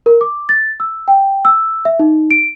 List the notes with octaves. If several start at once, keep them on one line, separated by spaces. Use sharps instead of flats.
A#4
D6
A6
E6
G5
E6
E5
D#4
D7